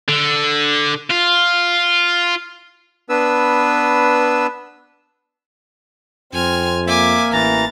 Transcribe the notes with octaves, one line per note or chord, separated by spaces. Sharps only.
D3
F4
B3 D4 B4 E6
F2 C4 G#5 F6
A#3 E5 G#5 D6
A1 E3 A#5 A6